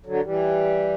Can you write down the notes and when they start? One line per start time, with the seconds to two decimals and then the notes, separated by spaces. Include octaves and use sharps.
0.06 D3 F#3
0.23 E3 G3